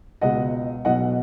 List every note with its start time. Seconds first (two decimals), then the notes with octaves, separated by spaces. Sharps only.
0.21 C#2 B2 D#5 F#5
0.85 B1 B2 D#5 F#5